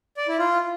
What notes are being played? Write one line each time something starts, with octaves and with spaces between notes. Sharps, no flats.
D5
E4
F4